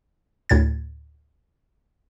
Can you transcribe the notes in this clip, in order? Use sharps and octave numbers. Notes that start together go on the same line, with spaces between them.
D2 A2 G#6 A6